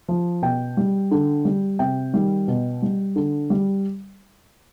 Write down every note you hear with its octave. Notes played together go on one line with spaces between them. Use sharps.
F3
B2 G5
G3
D3
G3
C3 G5
D#3 G3
B2
G3
D3
G3